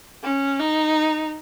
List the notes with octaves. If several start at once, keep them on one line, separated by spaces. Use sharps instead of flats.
C#4
D#4